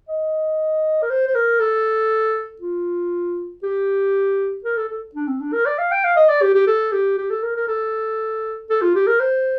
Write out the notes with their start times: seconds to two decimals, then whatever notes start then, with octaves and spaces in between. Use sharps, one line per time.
0.09 D#5
1.02 A#4
1.10 C5
1.27 C5
1.35 A#4
1.60 A4
2.61 F4
3.63 G4
4.64 A#4
4.77 A4
4.89 A4
5.15 D4
5.27 C4
5.40 D4
5.53 A#4
5.65 D5
5.79 F5
5.92 G5
6.04 F5
6.16 D#5
6.29 D5
6.42 G4
6.54 G4
6.67 A4
6.92 G4
7.17 G4
7.31 A4
7.43 A#4
7.56 A#4
7.68 A4
8.70 A4
8.82 F4
8.95 G4
9.07 A#4
9.20 C5